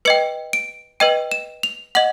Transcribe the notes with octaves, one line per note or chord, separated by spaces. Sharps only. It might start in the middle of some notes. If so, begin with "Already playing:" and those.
B4 D#5 G5 C#7
D7
B4 D#5 G5 D#7
E7
F7
D#5 F#5 F#7